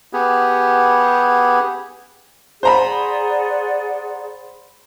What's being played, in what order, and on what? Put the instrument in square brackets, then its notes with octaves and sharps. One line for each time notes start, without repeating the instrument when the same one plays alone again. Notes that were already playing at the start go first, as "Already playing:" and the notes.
[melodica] B3 G4 G#4
[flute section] G#4 D5 F#5 [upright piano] C5 A#5 B5